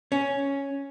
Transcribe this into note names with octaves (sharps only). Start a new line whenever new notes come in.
C#4